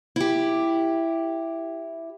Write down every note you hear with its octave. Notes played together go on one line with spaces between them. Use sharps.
E4 G4